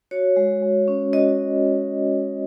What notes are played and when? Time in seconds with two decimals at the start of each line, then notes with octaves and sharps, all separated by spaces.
0.11 F#4 C#5
0.36 G#3
0.62 G#3
0.88 C#4
1.13 F#4 D#5